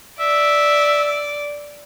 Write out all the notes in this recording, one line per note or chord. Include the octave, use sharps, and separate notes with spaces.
D5 E5